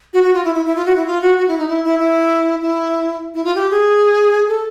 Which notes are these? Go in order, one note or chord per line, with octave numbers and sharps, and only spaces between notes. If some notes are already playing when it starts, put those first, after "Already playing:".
F#4
F#4
F4
E4
E4
E4
F4
F#4
E4
F4
F#4
F#4
E4
D#4
E4
E4
E4
E4
E4
F4
G4
G#4
A4